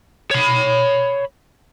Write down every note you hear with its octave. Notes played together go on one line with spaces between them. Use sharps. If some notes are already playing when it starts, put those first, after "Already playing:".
C#5 B5